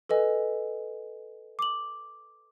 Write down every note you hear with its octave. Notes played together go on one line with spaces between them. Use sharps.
A4 B4 D#5 G#5
D6 F#7